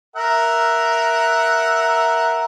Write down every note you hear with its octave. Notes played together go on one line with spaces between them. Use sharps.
A#4 E5 F#5